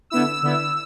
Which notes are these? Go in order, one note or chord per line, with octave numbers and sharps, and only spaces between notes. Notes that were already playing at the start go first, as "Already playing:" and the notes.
D3 B3 E4 E6
D3 B3 E4